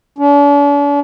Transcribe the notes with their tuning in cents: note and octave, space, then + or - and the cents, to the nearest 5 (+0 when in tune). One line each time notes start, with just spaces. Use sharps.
D4 -45